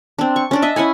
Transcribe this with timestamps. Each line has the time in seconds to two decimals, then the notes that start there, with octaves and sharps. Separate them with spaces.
0.19 C4 D4
0.36 C#6
0.51 C#4 D4 D5
0.62 D#5 E5 A5
0.76 C#4 E4 F#5 G#5